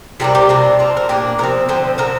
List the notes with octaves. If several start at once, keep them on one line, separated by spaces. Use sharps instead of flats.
C3 G3 A#3 D4 G4
G4
C3 G3 A#3 D4
F3 C4 F4
A#4
A#2 A#3 D4 G4
C3 F3 C4 A#4
D3 F3 C4 C5
D3 F3 C4 A#4